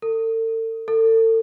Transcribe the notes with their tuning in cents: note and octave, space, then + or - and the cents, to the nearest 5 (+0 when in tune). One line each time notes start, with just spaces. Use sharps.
A4 +40
A4 +35